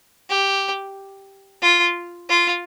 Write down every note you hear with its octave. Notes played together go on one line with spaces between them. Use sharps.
G4
F4
F4